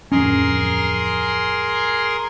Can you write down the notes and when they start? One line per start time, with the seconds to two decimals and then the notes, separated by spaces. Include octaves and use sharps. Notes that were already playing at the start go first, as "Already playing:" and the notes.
0.12 D1 F2 C#4 G#4 A#4 C6